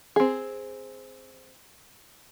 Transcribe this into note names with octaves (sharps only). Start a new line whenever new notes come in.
C4 G#4